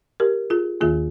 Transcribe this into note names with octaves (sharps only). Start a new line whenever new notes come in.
G4 A#4
F4 G#4
D#2 D#3 A#3 F4 G#4